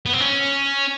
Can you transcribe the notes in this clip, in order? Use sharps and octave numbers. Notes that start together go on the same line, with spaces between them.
B3
C4
C#4